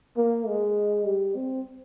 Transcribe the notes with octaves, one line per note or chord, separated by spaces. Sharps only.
A#3
G#3
G3
C4